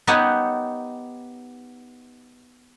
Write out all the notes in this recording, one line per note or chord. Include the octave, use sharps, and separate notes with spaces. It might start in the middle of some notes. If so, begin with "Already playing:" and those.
B3 D#4 G4 C#5 D#5 F#5